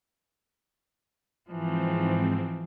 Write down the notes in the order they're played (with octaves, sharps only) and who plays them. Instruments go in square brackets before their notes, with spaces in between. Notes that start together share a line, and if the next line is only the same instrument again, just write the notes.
[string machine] G#2 C4 [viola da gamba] E3 F3